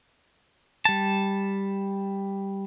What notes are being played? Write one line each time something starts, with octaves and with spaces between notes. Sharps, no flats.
G3 A5